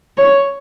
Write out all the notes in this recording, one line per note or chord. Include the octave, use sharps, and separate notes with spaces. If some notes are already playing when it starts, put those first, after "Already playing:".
C#5